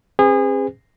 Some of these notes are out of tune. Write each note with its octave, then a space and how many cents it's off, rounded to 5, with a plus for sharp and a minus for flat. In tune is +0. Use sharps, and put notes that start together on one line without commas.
C4 +45 G#4 -30 B4 +45